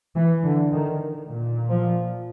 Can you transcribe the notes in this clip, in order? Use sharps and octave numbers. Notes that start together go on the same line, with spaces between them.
E3
D3
D#3
A#2
F3